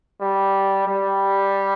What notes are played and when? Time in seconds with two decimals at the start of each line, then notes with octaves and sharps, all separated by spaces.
0.20 G3
0.87 G3